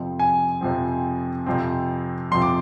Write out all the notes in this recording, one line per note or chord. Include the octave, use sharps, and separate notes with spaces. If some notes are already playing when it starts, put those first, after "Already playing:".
Already playing: F2 C3 F3 C4
G#5
F2 C3 F3 C4
F2 C3 F3 C4
F2 C3 F3 C4 C6
D6